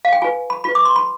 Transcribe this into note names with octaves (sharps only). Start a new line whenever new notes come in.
F5
G5
F4 B4 G#5
B5
F4 B4 B5
D6
C6
B5